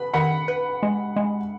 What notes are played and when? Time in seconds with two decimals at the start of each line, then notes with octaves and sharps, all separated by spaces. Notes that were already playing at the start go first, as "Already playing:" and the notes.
Already playing: B4 B5
0.13 D#3 F#5 B5
0.48 B4
0.83 G#3
1.16 G#3